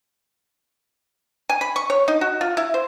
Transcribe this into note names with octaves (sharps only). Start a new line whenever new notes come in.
G#5
B5
C#6
C#5
D#4
F#4
F4
E4
C5